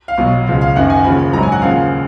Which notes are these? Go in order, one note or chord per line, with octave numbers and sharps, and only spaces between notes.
F5
B1 B2 F#3
C#2 C#3 F3 F5
F5
F#1 F#2 D#3 F#5
G#5
D#2 C#3 F3 B5
B5
A#1 G#2 F#3 A#5
G#5
F#5
D#2 C#3 F3 F5